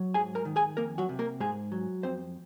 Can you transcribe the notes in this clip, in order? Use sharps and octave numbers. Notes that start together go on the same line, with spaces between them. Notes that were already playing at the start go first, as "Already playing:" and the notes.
Already playing: F#3
G#2 G#4 G#5
A#4 A#5
D#3
G#4 G#5
F2 A#3 A#4
F#3 F#4
C3
A#3 A#4
G#2 G#3 G#4
F#3
F2 C4 C5